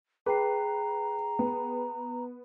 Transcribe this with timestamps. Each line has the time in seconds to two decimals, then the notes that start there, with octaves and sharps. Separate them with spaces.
0.26 G#4 B4 G5 A#5 C7
1.39 B3